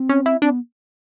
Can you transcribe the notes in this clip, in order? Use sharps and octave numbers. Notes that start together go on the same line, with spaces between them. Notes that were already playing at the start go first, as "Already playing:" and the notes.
Already playing: C4
C#4
E4
C4 D4
B3